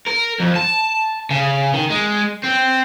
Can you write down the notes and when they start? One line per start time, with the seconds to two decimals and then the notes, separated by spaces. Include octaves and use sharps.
0.07 A#4
0.40 F2
0.56 A5
1.30 C#3
1.74 D#3
1.90 G#3
2.43 C4